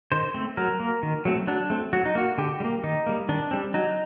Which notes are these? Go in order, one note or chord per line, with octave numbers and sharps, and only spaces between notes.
D#3 C5
A3 C4
F#3 A#4
A#3
D#3
F#3 A3 C4
F#3 D4
A3 C4
F#3 F#4
D#4
A#3 F#4
D3 G4
G3
A#3
D#3 D#4
G3 A#3
D#3 D4
G3 C4
F#3 D#4